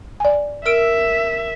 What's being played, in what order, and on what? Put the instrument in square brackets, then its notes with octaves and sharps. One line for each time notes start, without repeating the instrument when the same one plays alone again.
[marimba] D5 G#5
[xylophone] A#4 E6 D7 [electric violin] E5